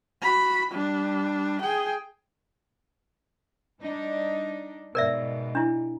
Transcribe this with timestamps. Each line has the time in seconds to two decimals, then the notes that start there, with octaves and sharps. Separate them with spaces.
0.22 F#4 B5
0.71 G3 D4
1.61 G#4 G5
3.82 G3 D4 D#4
4.95 G#2 B2 A#4 D5 E5
5.55 D4 E4